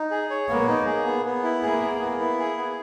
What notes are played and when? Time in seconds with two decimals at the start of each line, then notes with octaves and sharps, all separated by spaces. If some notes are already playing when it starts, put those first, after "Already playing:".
Already playing: D#4
0.11 G#4
0.30 C#5
0.48 A#3 B3
0.68 D#4
0.86 G#4
1.05 B3
1.25 B3
1.43 E4
1.62 A#3 G#4
1.82 B3
2.00 B3
2.20 E4
2.39 G#4
2.58 B3